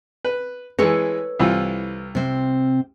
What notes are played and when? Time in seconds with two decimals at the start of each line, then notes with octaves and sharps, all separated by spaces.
0.25 B4
0.79 E3 G#3 A4 B4 C#5
1.39 C2 E3 F4
2.15 C3 C4